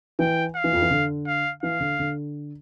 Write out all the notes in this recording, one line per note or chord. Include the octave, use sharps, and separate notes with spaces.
E3 G5
F5
E3
F2 F3
E3
D3
F5
E3 F5
D3
D3